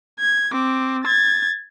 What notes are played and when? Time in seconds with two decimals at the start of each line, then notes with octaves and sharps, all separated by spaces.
0.20 G#6
0.52 C4 D6
1.04 G#6 A6